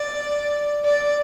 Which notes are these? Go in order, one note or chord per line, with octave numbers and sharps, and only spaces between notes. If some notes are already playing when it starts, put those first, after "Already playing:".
Already playing: D5
D5